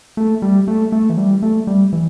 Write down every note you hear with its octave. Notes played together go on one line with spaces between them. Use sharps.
A3
G3
A3
A3
E3
G3
A3
G3
E3